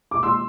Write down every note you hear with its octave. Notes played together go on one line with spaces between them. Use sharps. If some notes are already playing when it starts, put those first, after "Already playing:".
D6
C6 E6